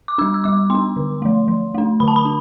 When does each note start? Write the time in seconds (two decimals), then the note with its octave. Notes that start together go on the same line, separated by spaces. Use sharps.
0.08 D6
0.18 G3 D4 E6
0.34 E6
0.44 G3 D6
0.70 B3 D4 C6
0.96 D3
1.22 F3 A3
1.48 F3
1.74 A3 D4
2.00 D3 B5
2.08 A5
2.16 B5
2.25 D4